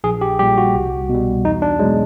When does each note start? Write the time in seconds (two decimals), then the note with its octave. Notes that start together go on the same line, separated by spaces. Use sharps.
0.04 A#1 G#4
0.21 G4
0.39 A#2 G3 G4
0.58 F#4
0.74 C2
1.09 B2 G3
1.44 E2 D#4
1.62 D4
1.79 B2 F#3 G#3